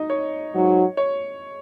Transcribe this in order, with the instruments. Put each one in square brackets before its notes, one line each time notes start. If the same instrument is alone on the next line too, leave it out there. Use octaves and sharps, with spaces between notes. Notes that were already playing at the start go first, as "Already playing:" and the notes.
Already playing: [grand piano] D#4 D#5
C#5
[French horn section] G#2 F#3 D#4 F#4
[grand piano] C#5